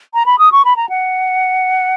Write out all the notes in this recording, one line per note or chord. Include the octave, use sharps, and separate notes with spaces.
A#5
B5
D#6
C#6
B5
A#5
F#5